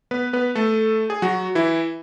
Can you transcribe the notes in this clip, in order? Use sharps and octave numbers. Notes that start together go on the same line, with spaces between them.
B3 B4
B3 B4
A3 A4
G#4
F#3 F#4
E3 E4